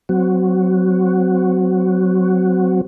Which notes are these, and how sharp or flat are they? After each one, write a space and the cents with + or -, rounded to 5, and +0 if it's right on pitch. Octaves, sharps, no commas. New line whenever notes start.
F#3 +0 C4 -20 F#4 +0